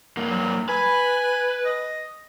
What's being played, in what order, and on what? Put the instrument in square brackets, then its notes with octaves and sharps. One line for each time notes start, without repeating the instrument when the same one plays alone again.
[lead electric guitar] G2 A#3
[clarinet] F#3
[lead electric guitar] B4 [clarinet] G#5
[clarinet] D#5